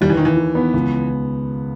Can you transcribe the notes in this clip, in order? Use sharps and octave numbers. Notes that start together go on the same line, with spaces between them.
D#2 G3
E3
D#2 D#3
E3
D#3
B3
C#2